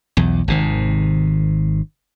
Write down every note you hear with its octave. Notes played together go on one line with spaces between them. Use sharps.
B1 E2
G#1 C3 D#3